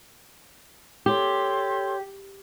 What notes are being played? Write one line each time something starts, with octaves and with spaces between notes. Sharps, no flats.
G4 A4 C#5 C6